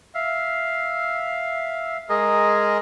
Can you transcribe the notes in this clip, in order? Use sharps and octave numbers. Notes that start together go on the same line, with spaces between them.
E5 F5
G#3 G#4 A#4 D#5